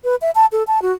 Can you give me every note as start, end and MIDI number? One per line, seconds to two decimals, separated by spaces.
0.04 0.16 71
0.22 0.31 76
0.35 0.46 81
0.52 0.63 69
0.67 0.82 81
0.82 0.92 66